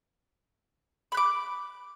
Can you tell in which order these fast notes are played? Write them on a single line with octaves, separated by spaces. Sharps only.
B5 F#6 D6